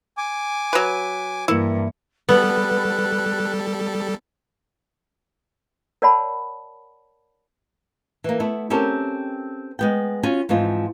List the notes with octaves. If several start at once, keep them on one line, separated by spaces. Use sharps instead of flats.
G#5 D6
F#3 B4
G2 E3 A#3 E4 C#7
G3 B3 A4 F#6
A#4 C#5 D5 F#5 A5 B5
E3 A#3
A3 B3 E4
C4 C#4 G4 A4 A#4
G#3 B3 G5
C#4 F4 F#4 G#5
G#2 E3 F3 C4 F4